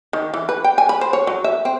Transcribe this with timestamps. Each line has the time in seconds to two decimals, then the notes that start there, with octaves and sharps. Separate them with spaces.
0.13 D#3
0.34 E3
0.49 B4
0.64 G5
0.78 G#5
0.89 B5
1.01 C5
1.13 C#5
1.27 F#3
1.44 E5
1.65 C4